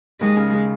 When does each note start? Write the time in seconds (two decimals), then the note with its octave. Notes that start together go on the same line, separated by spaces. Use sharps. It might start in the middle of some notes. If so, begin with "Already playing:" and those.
0.21 D#2 G#3
0.37 C#3
0.53 C#3